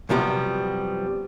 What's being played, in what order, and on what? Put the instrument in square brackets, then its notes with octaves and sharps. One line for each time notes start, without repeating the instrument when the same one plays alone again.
[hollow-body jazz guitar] F#2 C3 F3 G3 B3